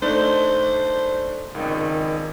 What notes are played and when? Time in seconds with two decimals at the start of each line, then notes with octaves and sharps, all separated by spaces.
0.02 A3 D4 D#4 C5
1.55 G#1 C#2 D#3